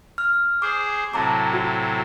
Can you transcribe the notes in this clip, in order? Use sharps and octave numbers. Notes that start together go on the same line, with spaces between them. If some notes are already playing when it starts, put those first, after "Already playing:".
F6
G#4 C5 D6
A2 C3 F#3 A5 A#5 D6
F#4